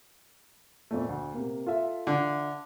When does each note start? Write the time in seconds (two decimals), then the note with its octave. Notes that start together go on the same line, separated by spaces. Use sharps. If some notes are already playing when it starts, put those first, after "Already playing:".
0.91 F2 A#2 A3
1.09 D2
1.34 C3 A#3
1.66 F4 A4 E5
2.07 D3